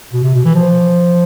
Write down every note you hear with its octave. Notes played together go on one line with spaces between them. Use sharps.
B2
C3
B2
E3
F3